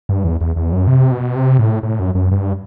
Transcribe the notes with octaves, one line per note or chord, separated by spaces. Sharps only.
G2
E2
E2
E2
F#2
C3
B2
C3
A2
A2
F#2
F#2
G2